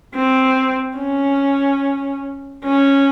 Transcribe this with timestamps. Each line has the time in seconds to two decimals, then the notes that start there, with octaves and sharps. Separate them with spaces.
0.15 C4
0.98 C#4
2.65 C#4